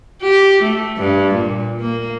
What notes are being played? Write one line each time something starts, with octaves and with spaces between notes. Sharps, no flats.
G4
A3
G2
A#2
A#3